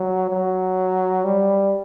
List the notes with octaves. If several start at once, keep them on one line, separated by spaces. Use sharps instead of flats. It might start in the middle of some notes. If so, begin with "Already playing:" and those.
Already playing: F#3
F#3
G3